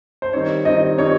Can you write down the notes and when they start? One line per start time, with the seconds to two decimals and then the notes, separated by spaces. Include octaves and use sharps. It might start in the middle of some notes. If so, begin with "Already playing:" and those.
0.22 C5
0.33 D#3 G3 C4 D#4 C#5
0.65 D#3 G3 C4 D#4 D#5
0.98 D#3 G3 C4 D#4 C#5